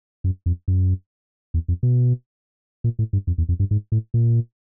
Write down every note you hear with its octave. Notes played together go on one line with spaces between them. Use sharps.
F#2
F2
F#2
E2
F2
B2
A#2
A2
G2
F2
E2
F2
G2
G#2
A2
A#2